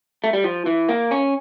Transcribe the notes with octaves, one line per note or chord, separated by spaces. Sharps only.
A3
G3
F3
E3
A#3
C#4